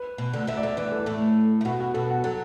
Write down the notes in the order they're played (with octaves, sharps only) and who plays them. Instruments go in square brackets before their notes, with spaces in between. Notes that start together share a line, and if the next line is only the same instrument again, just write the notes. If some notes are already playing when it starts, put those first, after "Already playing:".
Already playing: [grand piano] B4
[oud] B2
D2 D3
[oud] D2 D3 [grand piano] E5
[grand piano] D5
[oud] D2 D3 [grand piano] E5
[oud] E2 E3 [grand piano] D5
[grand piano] A4
[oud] A2 A3
A3
[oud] B2 B3 [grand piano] F#4
[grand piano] F#4
[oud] B2 B3 [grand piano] A4
[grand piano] F#4
[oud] F#3 [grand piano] A4